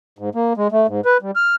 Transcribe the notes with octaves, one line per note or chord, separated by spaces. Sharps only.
G#2
A#3
G#3
A3
G#2
B4
G3
F6